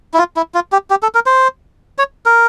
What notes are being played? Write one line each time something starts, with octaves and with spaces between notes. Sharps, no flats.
E4
F4
E4
F4
G4
G4
A4
A#4
C5
C#5
A#4